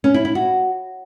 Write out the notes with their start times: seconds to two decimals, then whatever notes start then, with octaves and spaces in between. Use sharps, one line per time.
0.04 C#4
0.14 E4
0.25 E4
0.35 F#4